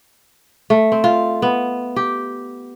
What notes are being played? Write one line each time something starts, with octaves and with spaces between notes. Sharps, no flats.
A3
C4
F4
B3
G4